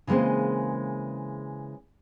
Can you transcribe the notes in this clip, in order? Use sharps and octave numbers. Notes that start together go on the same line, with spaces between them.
C#3 E3 G#3 A#3 C4